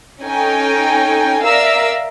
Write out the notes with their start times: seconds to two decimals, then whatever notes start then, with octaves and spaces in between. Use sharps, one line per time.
0.22 C#4 D#4 A4 G5 G#5
1.43 A#4 D5 E5 F5 A#5 E6